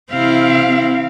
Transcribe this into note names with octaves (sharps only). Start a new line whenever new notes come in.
C3 E3 C4 E4 F5